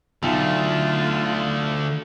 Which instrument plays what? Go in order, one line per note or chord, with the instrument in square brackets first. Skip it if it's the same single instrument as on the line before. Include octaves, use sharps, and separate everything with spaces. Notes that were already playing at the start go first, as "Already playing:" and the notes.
[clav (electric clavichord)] B1 [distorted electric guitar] D3 A3 [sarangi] F4